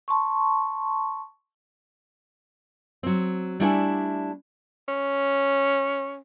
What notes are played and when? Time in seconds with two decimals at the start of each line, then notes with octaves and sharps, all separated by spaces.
0.08 A5 C6 C#6
3.03 F#3 C4
3.60 G3 A3 D4 E4 G5 G#5
4.88 C#4